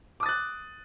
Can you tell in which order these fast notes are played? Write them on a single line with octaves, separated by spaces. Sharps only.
D6 D#6 A6 F#6